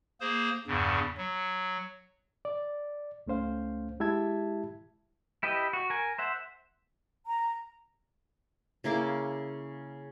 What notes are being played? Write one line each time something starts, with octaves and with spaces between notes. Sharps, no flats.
A#3 G#4 C5
E2 G2 C#3
F#3
D5
C#2 A3 C#4 C5 F5
G#3 E4 G4 E5 A5 G#6
E4 G4 B4 D#5
F#4
A#4 G#5
C5 E5 F#5
A#5
C#3 A#3 E4 D6